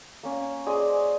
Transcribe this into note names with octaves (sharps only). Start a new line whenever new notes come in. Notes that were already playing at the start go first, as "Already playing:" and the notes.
A#3 C#4
G#4 C5 D5 D#5